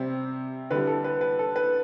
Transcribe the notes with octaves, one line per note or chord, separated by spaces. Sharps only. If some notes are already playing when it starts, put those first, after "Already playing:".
Already playing: C3 G3 C4
D3 G3 B4
A4
B4
B4
A4
B4